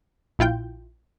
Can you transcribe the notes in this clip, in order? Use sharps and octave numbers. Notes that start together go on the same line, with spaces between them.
A#1 E4 F4 G5 G6